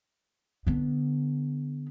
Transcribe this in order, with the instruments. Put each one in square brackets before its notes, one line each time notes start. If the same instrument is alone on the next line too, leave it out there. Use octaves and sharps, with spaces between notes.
[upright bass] D3 B3